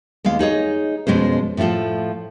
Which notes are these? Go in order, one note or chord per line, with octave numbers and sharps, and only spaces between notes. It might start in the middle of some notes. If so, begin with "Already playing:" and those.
D#2 G#3 B3 F5
D#4 G#4 C#5 D#5
F2 B2 G#3 C#4 C5
A2 F3 A3 F4 A4